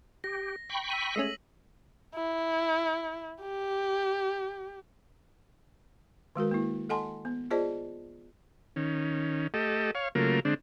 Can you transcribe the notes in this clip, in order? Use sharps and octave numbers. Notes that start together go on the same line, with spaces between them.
G4 A#6
G5 B5 C#6
E6 B6 D#7
G#3 A3 C#4 E6 D#7 F#7
E4
G4
D#3 G#3 F#4 A#4
A#3 E4
A4 D#5 F#5 G#5 A5 C6
B3
F4 G#4 C5 D5 D#5 A5
D#3 C#4
A3 G4 A4 D#5
C#5 F5
C#3 F#3 A3 A#3 F4 A#4
D3 G#3 C4 D4